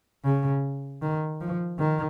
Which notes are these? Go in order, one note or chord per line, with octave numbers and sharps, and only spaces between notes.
C#3
D#3
F3
D#3